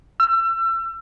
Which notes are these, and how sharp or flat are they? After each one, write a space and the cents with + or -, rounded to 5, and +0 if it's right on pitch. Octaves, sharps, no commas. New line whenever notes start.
E6 +35